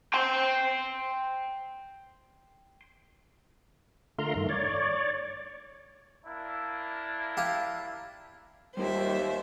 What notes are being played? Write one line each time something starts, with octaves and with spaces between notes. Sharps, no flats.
G5 C6
D3 A3 F4 A#4 A#5 C6
G2 D#3 A3
C#5 D5
A#3 D4 E4
F4 G4
D#2 G3 A#3 C5 E5 G5